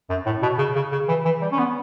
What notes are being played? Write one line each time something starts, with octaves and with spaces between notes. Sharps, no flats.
F#2
A2
B2
C#3
C#3
C#3
E3
E3
G3
C#4
B3